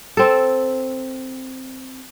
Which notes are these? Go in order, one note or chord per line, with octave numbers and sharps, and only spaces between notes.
C4 A4